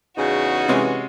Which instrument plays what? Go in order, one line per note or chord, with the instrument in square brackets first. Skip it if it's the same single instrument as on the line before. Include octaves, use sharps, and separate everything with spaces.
[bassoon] E2 [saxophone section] C#3 D#4 [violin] F#4
[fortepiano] C3 G#3 C#4 [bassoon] E3